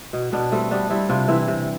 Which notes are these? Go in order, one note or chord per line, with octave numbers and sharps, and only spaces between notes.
B2
B2 B3 D4
G3 A3 C4
G3 B3 D4
G3 C4 E4
C3 D4 F4
E3 C4 E4
C3